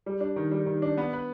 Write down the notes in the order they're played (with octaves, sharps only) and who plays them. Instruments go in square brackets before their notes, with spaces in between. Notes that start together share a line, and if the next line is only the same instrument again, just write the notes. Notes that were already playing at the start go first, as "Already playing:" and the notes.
[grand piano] G3
D4
D#3
G3
D#3
D4
B3
B4